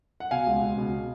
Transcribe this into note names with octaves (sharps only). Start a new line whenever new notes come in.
F#5
B2 F5 G#5
C#2
C#2
B2
B2